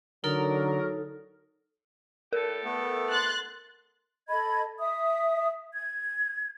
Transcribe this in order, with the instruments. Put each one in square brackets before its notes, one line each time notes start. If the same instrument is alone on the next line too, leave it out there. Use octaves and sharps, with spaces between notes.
[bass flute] D3 [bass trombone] F#3 [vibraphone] D#4 A4 [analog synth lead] A#4
[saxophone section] A2 G4 A4 [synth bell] A#4
[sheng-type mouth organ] A3 B3
[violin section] C6 F#6 A6
[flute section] A4 D#5 B5 G#6
E5 D#6
G#6